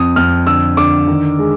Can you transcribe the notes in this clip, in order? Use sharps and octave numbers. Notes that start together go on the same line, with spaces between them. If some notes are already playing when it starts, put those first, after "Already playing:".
Already playing: F2 D#6
F2 F6
D3 E6
D3 D6
D#3
G#3